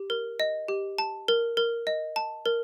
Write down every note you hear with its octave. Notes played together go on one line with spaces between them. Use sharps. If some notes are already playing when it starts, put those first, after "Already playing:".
Already playing: G4
A#4
D#5
G4
A5
A#4
A#4
D#5
A5
A#4